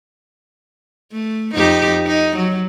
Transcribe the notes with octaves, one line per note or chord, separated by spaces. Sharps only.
A3
F2 D#4 G4
D#4
F#3